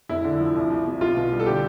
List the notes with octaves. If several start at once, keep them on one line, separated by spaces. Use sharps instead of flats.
F1 E4
D3
F3
C2
C2
C3
B1 F4
B2
G3
A4
D3 G4